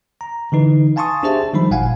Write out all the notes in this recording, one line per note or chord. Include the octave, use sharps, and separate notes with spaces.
A#5
D3 E3 D#4 B4
F5 G#5 A5 C6 C#6 D#6
D4 G4 G#4 C5 E5 A5
D#3 F3 G3 D#4 C5 B5
G#1 A#2 F5 F#5 G#5